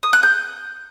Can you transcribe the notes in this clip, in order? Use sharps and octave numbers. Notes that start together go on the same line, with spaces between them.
D#6
F#6
G6